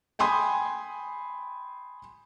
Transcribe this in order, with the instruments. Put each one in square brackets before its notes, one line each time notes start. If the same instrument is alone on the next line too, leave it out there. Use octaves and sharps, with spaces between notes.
[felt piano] G5 G#5 B5 C6 D#6